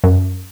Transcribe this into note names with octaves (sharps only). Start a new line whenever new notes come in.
F#2